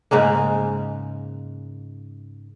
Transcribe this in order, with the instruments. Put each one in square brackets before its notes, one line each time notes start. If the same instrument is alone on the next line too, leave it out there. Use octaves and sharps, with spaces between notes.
[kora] G#2 C#3 G#3 A#3